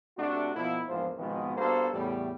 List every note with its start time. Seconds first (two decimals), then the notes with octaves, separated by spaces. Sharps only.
0.18 C3 A3 D4 F#4
0.56 B2 F3 A#3 E4
0.89 A#1 E2 G#2 F3 A#3 C5
1.18 G#1 B2 D#3 F3 G#3 B3
1.57 G2 A#3 B3 F#4 A4 C5
1.94 E2 A2 G3